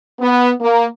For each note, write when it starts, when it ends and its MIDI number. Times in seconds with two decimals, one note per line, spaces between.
0.19 0.50 59
0.60 0.85 58